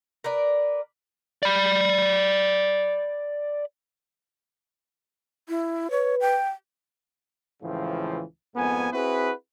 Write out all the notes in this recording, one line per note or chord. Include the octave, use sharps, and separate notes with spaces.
A#4 B4 D5
D5 B5
E4
B4 C#5
G5
C#2 A2 C#3 E3 F3 C4
F2 G#2 A#3 B3 G#5
C4 E4 F#4 G#4 B4